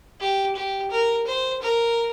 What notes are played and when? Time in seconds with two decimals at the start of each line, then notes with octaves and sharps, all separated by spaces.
0.20 G4
0.56 G4
0.91 A#4
1.27 C5
1.62 A#4